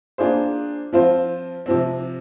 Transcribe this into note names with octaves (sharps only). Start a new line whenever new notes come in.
A#3 D4 F4 G#4 C5
F3 C4 F4 C5
C3 F3 C4